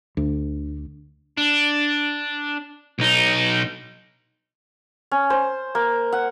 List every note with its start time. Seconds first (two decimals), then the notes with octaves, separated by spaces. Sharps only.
0.17 D2
1.38 D4
2.99 B1 D#4
5.11 C#4
5.30 C5
5.75 A#3
6.12 F#5